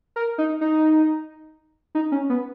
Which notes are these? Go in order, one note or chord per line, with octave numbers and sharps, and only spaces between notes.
A#4
D#4
D#4
D#4
C#4
B3